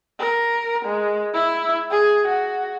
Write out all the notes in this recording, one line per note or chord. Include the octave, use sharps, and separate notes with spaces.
A#4
G#3
E4
G#4
F#4